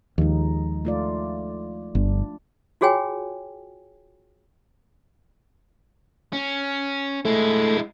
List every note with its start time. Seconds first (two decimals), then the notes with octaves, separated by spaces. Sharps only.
0.18 D#2 F3 G#3 D#4
0.85 A3 F4 D5
1.95 G1 D4
2.81 F4 F#4 G#4 C#5 G5 G#5
6.33 C#4
7.25 G#3 A3 E4